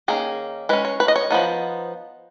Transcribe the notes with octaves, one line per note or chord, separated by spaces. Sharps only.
D#3 A#3 C#4 G#4
G#3 C#4 B4
C#5
B4
D#5
C#5
F3 B3 D#4